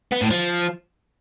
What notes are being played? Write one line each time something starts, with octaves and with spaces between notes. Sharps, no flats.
B3
A2
F3